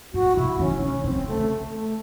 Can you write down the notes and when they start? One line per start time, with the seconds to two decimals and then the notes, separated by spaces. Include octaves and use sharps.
0.13 A2 F#4
0.36 C3 E4
0.59 D#3 C#4
0.82 D#3 C#4
1.04 C#3 C4
1.27 A3
1.73 A3